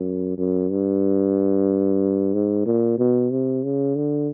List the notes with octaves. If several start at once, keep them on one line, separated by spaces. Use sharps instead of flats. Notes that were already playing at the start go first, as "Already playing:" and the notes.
Already playing: F#2
F#2
G2
G#2
A#2
B2
C3
C#3
D3